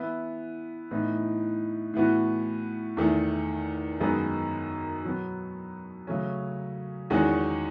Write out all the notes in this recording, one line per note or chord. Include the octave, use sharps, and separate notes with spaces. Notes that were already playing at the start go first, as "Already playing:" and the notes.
Already playing: E3 B3 E4
A2 E3 B3 D#4
A2 E3 B3 F#4
E2 D#3 A3
F#2 D#3 G#3 B3
B2 F#3 B3
C#3 F#3 A3 C#4
E2 D#3 G#3 C#4 F#4